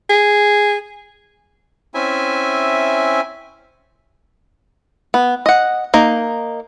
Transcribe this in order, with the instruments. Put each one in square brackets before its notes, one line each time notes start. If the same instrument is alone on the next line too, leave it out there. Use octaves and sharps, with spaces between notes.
[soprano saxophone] G#4
[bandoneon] C4 C#4 E4 E5 G#5
[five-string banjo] B3
D#5 F#5
A#3 D#4